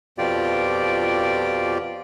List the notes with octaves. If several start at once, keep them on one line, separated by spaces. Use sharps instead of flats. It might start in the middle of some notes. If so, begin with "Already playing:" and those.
F2 B2 F4 G4 D5